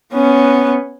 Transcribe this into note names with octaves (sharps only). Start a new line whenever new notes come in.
B3 C#4